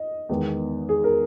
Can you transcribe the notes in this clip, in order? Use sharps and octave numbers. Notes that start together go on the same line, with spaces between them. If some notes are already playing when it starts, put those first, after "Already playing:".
Already playing: D#5
E2 D#3 G#3 B3
G#4
A#4